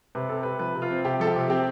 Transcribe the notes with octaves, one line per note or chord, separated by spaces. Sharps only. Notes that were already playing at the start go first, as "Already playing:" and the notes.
C3 B4
C4 A4
C3 B4
F3 B4
C3
F4
C4
C3 G4
F3 A4
G4
C3
C4 G4